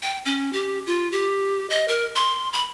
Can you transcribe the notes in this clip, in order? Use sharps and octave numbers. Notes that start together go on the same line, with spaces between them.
G5
C#4
G4
F4
G4
D#5
A#4
C6
B5